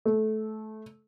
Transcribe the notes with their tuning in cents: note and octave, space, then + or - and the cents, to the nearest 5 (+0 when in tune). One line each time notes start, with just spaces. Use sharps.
A3 -20